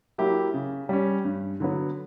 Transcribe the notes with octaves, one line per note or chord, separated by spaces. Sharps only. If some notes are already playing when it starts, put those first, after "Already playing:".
F#3 A#3 E4 G4
C#3
G3 C#4
G2
D3 F#3 B3